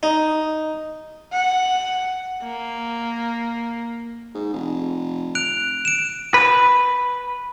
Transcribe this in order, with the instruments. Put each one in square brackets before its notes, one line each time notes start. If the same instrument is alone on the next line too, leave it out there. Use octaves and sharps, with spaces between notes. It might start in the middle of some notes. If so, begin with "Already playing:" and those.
[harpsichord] D#4
[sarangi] F#5
A#3
[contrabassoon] G#2
F1
[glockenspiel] F#6 D7 F7
D7 E7
[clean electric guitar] B4